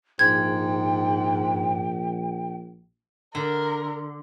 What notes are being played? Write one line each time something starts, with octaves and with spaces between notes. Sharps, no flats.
A#1 G#2 G5 G#6
D3 A#4